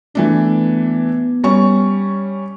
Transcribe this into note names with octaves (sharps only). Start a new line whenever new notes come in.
E3 A3 B3 D4
G3 C#4 C#6